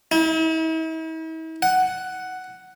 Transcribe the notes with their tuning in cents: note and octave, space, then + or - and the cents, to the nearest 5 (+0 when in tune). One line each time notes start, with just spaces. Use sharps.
E4 -45
F#5 +5